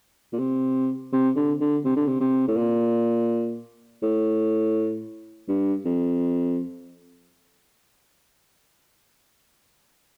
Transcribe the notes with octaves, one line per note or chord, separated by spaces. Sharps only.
A#2
C3
C3
D3
D3
C3
D3
C3
C3
A2
A#2
A2
G2
F2